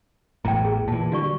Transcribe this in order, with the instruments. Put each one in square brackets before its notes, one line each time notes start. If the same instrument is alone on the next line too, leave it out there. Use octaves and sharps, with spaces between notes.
[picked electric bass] A1 E2 A2 [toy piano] G5 A#5
[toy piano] G#4
[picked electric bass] A#2 E3 [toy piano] A5
[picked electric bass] D3 G3 [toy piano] F#4 D5 C#6